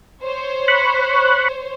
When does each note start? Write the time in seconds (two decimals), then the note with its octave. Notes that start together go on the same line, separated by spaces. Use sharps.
0.22 C5 C#5
0.68 B5 C#6 F#6